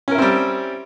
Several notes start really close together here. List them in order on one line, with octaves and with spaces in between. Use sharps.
C#4 A#4 E4 C4 G3